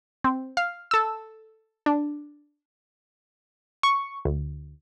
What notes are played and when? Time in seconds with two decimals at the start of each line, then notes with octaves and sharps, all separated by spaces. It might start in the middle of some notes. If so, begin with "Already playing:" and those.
0.24 C4
0.57 F5
0.91 A4 E6
1.86 D4
3.83 C#6
4.25 D2